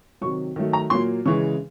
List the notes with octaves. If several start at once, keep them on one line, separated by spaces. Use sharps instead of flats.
C3 D#3 F#3 C#6
D#3 F#3 A3
A#5
A#2 F#3 A#3 C6
C#3 E3 G#3 C#6